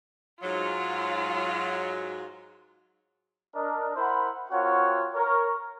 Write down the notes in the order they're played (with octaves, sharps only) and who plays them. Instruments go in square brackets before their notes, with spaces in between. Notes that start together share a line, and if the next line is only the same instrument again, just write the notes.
[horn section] G#2 F#3 [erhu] F4
[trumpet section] D4 A#4 D#5
E4 A#4 C5 F#5 B5
C4 F4 F#4 A#4 C#5 F#5
A#4 C#5